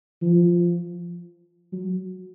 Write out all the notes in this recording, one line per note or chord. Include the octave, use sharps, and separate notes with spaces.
F3
F#3